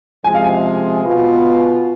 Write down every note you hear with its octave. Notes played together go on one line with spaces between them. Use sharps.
C3 F3 G#3 G#5
F5
G#5
B2 B3 F4